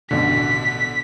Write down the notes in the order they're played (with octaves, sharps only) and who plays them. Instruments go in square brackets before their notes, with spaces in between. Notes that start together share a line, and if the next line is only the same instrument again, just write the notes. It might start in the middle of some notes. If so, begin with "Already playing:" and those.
[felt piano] A1 B2 [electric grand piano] D3 [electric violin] B6